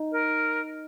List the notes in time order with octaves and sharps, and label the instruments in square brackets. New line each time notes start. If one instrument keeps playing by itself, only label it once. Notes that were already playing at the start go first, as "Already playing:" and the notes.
Already playing: [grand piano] D#4
[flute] A#4